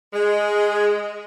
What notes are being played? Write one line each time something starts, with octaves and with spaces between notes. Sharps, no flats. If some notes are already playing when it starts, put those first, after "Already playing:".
G#3